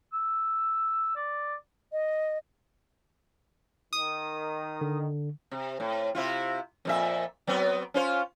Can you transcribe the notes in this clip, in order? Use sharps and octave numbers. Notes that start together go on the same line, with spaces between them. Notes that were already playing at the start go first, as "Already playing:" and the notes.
E6
D5
D#5
D#3 D#6
D3
C3
A2
C3 E4 F4
F2 A#2 E5
F#3 B3 C4
C#4 F4 C5